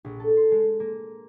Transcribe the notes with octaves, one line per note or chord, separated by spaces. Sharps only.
A#1
A4
C6
G#3
A#3